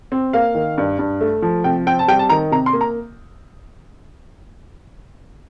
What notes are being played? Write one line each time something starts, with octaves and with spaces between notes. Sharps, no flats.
C4
A#3 F5
D#3
G2
G2
A3
F3
C3 G5
C4 G5
A5
G3 G5
A5
D#3 A#5
C3 A#5
C6
A#3
A#5